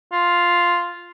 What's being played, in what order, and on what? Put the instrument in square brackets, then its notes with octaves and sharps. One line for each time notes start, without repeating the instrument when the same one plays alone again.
[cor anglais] F4